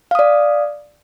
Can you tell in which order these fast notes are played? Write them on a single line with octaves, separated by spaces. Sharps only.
F5 D#6 D5